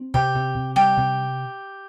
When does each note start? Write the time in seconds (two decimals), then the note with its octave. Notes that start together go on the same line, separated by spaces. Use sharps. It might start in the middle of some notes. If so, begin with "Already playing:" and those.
Already playing: C4
0.14 C3 G4
0.35 C3
0.55 C3
0.76 G3 G4
0.97 C3